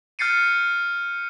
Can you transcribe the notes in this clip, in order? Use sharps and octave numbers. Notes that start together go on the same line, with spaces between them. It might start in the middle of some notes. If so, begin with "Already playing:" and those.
F6 G6 A6 C7 C#7 D#7